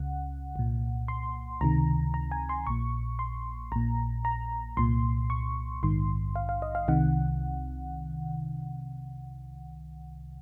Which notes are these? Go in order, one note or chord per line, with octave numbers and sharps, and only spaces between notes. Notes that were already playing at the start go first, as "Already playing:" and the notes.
Already playing: C#2 C#3 F#5
C2 A#2
C6
C#2 C3 D#3 A#5
A#5
G#5
C6
A#1 A#2 C#6
C6
A#1 A#2 A#5
A#5
C2 A#2 C6
C#6
A#1 G#2 D#3 C6
F5
F5
D#5
F5
C2 C3 D#3 F#5